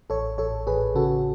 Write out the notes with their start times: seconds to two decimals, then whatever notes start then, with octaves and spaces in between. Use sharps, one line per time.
0.10 A1 A4 C#5
0.38 A1 A4 C#5
0.67 A1 G#4 B4
0.95 C#3 F#4 A4